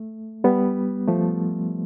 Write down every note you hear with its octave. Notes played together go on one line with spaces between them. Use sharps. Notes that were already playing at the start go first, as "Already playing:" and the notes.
Already playing: A3
G3 B3
F3 A3